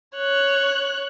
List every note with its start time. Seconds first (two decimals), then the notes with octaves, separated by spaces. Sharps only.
0.17 C#5 F#6